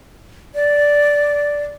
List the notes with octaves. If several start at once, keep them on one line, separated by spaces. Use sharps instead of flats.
D5